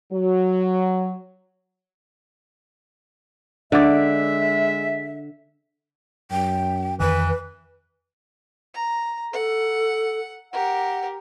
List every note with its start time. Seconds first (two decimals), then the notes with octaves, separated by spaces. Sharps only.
0.12 F#3
3.72 D3 G#3 D5 E5
6.31 F#2 G5
7.00 F2 D#3 E3 B4
8.74 A#5
9.33 A4 F#5
10.53 G4 A#4 F#5